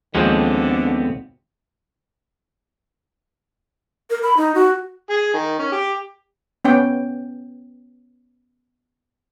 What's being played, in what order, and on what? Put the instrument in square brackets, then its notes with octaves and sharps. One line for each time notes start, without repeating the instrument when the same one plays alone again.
[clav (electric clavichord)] D#2 F3 G#3 [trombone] D3 [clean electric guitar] B3 C4 A4
[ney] A#4
B5
D#4
F#4
[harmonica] G#4
D#3
C#4
G4
[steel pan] B3 C#4 G5